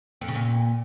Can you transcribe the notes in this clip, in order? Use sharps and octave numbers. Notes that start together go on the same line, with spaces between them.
F2
C#3
A#2